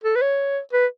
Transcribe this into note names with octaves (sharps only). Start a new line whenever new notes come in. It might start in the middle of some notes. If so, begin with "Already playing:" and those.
A4
B4
C#5
B4